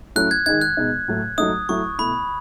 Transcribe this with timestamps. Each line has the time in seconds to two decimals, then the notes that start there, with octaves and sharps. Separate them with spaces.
0.16 F#3 A3 C#4 E4 F#6
0.31 G#6
0.46 D#3 G#3 D#4 G#6
0.61 F#6
0.77 B2 G#3 D#4
1.08 A2 F#3 A3
1.38 F#3 A3 D#4 D#6
1.69 F#3 A3 E4 C#6
1.99 B2 A3 E4 B5